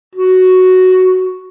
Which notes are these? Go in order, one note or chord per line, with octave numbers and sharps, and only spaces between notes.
F#4